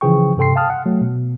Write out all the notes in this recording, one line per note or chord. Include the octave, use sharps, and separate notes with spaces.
C#3 E3 F3 G#4 G5 C#6
G2 C3 A4 G5 C6 C7
F5 G5 A5 D#6 F6
F#5
F#3 A3
B2